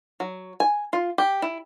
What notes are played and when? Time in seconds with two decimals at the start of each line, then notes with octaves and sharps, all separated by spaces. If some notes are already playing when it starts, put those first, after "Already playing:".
0.20 F#3
0.60 G#5
0.93 F4
1.18 G4
1.42 E4